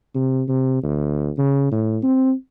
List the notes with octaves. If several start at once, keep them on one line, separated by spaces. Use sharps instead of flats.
C3
C3
D2
C#3
A2
C4